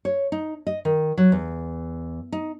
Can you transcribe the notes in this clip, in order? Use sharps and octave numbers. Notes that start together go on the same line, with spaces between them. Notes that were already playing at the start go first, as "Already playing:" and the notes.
C#5
D#4
D#5
D#3
F#3
E2
D#4